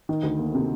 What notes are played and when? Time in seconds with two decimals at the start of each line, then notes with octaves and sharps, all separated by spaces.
0.09 D#3
0.23 D2
0.39 A#3
0.55 C3